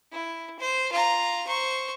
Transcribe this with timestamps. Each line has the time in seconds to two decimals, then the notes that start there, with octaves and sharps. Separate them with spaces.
0.12 E4
0.59 C5
0.92 F4 A#5
1.47 C5 C#6